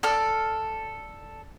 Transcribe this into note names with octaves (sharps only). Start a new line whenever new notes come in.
A4 D5 F6